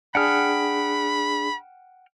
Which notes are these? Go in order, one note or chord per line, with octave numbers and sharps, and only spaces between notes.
D4 G#4 F#5 G5 B5 F6